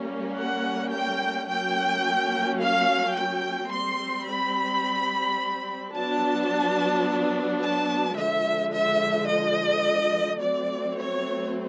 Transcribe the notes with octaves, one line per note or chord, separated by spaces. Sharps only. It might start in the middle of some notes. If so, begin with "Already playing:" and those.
Already playing: G3 A#3 C#4
F#5
G5
F#3 A#3 C#4 G5
F5
G5
G3 C4 C6
B5
F#3 B3 D4 A5
A5
D3 F3 G#3 E5
E5
D#5
F#3 A3 C4 D5
C#5